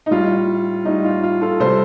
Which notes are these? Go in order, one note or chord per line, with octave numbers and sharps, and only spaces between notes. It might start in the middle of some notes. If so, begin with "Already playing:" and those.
D#4
A2 G3 F4
A2 G3 D#4
F4
F4
F4 A4
C3 G3 A4 C5